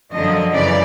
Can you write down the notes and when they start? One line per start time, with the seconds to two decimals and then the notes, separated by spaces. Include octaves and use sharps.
0.11 F#2 D3 F3 D#5
0.53 F#2 C#3 E3 D5